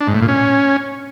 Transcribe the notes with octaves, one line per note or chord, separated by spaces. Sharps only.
D4
G#2
A2
A#2
C#4